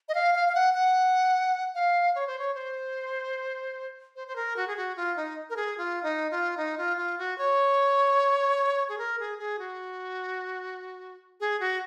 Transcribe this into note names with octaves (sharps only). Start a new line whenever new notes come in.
D#5
F5
F5
F5
F#5
F#5
F5
C#5
C5
C#5
C5
C5
C5
A#4
F#4
G#4
F#4
F4
D#4
A#4
G#4
F4
D#4
F4
D#4
F4
F4
F#4
C#5
G#4
A#4
G#4
G#4
F#4
G#4
F#4